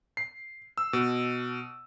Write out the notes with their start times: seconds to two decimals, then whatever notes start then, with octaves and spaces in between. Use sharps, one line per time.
0.17 C7
0.78 E6
0.93 B2